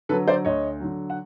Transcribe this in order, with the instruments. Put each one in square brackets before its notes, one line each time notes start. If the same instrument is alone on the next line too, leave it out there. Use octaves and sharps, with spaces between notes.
[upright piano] D3 F#3 A4 B4
C5 D5
D2 C#5 D#5
D3 F#3
F#5